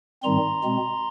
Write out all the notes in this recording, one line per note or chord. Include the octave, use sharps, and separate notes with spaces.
G#2 D#3 G3 C4 A#5 C6
B2 G#3 C4